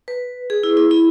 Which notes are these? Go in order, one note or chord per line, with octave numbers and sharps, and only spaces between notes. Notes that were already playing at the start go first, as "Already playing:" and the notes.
B4
G#4
E4
E4
E4